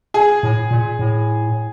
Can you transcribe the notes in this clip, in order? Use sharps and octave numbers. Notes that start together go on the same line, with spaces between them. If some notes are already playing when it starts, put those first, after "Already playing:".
G#4
A2
A#2
A2